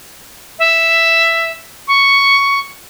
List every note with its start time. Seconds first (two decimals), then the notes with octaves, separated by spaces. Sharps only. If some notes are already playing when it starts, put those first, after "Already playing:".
0.59 E5
1.88 C#6